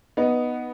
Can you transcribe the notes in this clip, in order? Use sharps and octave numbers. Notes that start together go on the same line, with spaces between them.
B3 D#4